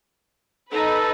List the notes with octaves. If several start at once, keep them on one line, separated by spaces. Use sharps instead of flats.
D#4 A4 B4